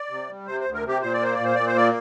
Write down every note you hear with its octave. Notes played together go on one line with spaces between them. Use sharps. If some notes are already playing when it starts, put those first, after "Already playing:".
Already playing: D5
C3
G3
C3 C5
C5
D2
A#4
C3 G4
A#2 C5
D5
A#3 C5
A#2 D5
C5
A#2 D5
C5
A#3 D5